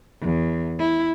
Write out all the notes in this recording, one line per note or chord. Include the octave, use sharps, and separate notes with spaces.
E2
E4